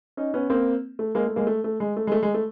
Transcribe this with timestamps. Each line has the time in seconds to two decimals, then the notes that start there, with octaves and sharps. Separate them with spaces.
0.17 C#4 D#4
0.34 B3 C#4
0.50 A#3 C4
0.99 A3
1.15 G#3 A#3
1.26 A3
1.36 G#3 A#3
1.47 A3
1.64 A3
1.80 G#3
1.97 A3
2.07 G#3
2.12 A3
2.23 G#3
2.34 A3